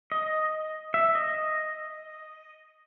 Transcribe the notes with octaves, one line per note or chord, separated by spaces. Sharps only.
D#5
E5
D#5